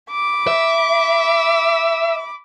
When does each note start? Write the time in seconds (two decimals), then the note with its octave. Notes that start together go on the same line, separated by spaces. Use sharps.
0.10 B5 D6
0.47 E5